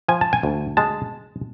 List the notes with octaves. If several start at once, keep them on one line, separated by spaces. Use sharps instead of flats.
F3 G#5
A5
G#5
D2
G#3 A5